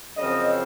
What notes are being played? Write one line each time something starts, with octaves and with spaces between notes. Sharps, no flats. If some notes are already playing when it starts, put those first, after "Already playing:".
F#2 C#3 F3 C4 D#5